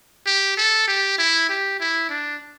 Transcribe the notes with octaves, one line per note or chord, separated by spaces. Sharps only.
G4
A4
G4
E4
G4
E4
D4